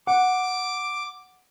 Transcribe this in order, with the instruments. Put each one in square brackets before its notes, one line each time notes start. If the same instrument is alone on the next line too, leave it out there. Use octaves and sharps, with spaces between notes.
[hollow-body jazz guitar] F#5 [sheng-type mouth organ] D6